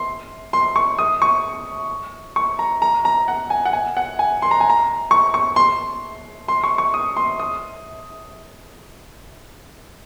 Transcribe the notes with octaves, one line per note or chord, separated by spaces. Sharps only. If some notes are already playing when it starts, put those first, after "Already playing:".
Already playing: C6
C6
C#6
D#6
C#6
C#6
A#5
A#5
A#5
F#5
G#5
F#5
G#5
F#5
G#5
C6
A#5
G#5
A#5
C#6
C#6
C6
C6
C#6
C#6
D#6
C6
D#6